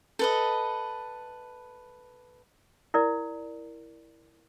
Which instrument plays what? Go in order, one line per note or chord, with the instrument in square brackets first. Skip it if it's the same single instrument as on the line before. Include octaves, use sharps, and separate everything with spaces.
[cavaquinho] A4 B4 D#5
[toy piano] E4 A#4 D5